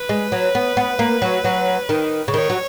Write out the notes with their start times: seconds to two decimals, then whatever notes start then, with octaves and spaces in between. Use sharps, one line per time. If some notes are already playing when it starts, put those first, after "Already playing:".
Already playing: B4
0.09 G#3
0.32 F#3
0.55 B3
0.77 B3
0.99 A#3
1.22 F#3
1.44 F#3
1.89 D#3
2.28 C#3
2.34 D#3 C#5
2.50 F#3